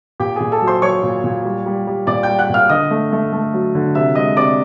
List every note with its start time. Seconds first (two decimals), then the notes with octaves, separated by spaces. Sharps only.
0.20 A#2 G4 G5
0.36 A#2 G#4 G#5
0.52 A4 A5
0.62 F#3
0.67 C5 C6
0.82 F#3 C#5 C#6
1.03 A#2
1.24 A#2
1.45 G3
1.66 G3
1.87 G3
2.07 A#2 D5 D6
2.23 G5 G6
2.29 G3
2.39 F#5 F#6
2.50 A#2 F5 F6
2.69 D3 D#5 D#6
2.91 A3
3.12 A3
3.33 A3
3.53 F#3
3.75 D3
3.95 C3 E5 E6
4.15 G#3 D#5 D#6
4.37 C3 D5 D6